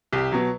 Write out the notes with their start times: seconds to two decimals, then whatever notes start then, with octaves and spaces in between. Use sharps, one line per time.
0.12 C2 G4
0.32 B2 F#3